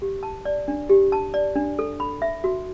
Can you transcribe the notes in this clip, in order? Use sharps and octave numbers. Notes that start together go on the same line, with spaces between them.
G4
A5
D5
D4
G4
A5
D5
D4
A4
B5
E5
F#4